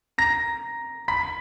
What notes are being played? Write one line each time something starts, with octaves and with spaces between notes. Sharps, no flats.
A#5 A#6
B5 B6